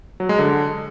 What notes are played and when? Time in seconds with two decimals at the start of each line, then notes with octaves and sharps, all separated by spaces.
0.20 F#3
0.29 G#3
0.39 D3